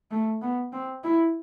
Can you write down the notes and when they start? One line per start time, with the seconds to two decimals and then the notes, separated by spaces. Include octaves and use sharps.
0.11 A3
0.42 B3
0.73 C4
1.04 E4